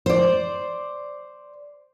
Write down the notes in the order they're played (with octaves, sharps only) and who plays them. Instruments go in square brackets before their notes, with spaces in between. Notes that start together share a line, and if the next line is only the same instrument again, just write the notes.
[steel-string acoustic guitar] C5 D5